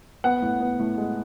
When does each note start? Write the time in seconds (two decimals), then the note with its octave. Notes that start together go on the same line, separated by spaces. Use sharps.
0.24 B3 F#5
0.42 A2
0.60 B3
0.79 A2
0.98 G#3